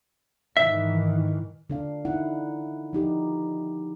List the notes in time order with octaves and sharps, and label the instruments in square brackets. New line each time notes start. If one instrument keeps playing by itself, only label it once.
[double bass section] G#2 D#3 E3 [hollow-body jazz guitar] E5
[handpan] D3 D4 F5
D#4 E4 F#5
F3 D#4 G4